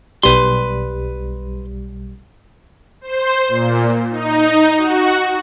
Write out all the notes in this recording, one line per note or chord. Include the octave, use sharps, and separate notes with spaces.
B1 G3 B4 C6
C5
A#2
D#4
F#4